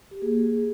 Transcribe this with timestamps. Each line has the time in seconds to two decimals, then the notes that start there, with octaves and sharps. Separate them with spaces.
0.11 G4
0.22 A#3 G#4